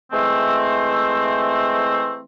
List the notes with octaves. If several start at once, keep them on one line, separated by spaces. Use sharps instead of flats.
E3 G#3 A3 C4